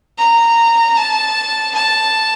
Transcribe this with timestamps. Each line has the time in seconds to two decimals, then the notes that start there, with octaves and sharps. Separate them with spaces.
0.18 A#5
0.97 A5
1.75 A5